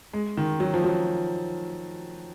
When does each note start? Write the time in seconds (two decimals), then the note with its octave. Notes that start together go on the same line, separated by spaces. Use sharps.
0.13 G#3
0.37 D#3
0.60 F#3
0.74 F3
0.84 F#3